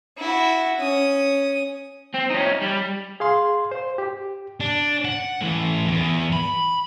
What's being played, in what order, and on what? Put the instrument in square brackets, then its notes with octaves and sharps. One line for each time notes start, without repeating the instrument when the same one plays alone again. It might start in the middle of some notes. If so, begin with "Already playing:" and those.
[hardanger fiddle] E4 F#4
C#4 D#6
[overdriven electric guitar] C4
C#4 D#4
G3
[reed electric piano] G#4 F5 C6
C5
G4
[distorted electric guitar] D4
F#5
A2 E3
E2
B5